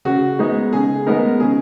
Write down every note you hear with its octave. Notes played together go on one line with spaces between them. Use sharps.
C#3 F#4
G#3 B3 D#4
C#3 G#4
G#3 B3 D#4 A#4
C#3 G#4